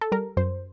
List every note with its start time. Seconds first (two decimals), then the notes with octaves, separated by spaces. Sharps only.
0.01 A4
0.12 G3 A#4
0.37 F#2 C5